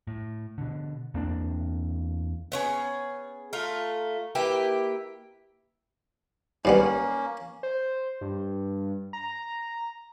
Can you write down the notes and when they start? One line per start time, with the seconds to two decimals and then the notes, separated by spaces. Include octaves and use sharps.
0.07 A2
0.58 B2 D3
1.14 E2 A#3 C4 D4
2.52 B3 C#4 G#4
3.53 A3 F4 A#5
4.35 A#3 E4 G4 B4
6.65 G#2 G3 A#3 B3 C#4
7.63 C5
8.21 G2
9.13 A#5